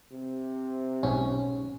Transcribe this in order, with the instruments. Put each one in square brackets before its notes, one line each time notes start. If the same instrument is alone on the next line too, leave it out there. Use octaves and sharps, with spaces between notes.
[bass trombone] C3
[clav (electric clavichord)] B1 G#2 F#5 [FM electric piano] C#4